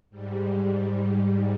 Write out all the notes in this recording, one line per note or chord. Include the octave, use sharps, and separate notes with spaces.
G#2 G3